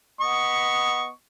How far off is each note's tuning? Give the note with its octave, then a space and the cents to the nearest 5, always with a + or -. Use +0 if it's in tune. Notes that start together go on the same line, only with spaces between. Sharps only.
B3 +0 D#5 +0 C#6 +0